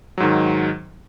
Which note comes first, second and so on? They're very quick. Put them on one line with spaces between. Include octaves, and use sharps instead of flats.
F#3 G#2 D#3